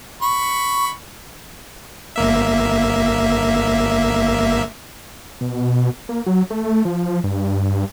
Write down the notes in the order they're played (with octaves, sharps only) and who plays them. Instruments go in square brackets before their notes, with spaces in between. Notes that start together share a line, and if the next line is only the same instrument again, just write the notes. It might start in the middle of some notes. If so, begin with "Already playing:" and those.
[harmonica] B5 C#6
[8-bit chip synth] G1 A#3 E5
[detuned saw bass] B2
A#3
F#3
A3
F3
G2